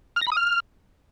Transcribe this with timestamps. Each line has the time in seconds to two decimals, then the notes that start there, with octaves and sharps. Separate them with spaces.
0.16 F6
0.21 A#6
0.27 B5
0.32 D#6
0.37 F6